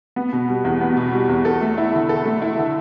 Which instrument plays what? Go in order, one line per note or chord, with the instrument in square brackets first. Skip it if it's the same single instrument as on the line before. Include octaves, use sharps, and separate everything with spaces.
[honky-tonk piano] B3
B2
G3
E2
B3
B2
G3
E2
A4
A3
E4
D3
A4
A3
E4
D3